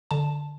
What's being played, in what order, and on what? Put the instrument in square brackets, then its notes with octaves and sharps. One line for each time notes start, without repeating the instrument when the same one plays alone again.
[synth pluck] D3 A5